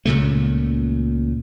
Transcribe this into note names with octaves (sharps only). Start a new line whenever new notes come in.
C#2 A#2 C#3 A3